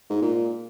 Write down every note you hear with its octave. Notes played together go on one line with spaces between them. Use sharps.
G#2
A#2